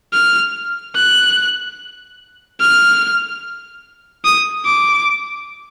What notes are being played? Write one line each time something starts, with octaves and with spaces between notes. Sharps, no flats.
F6
F#6
F6
D#6
D6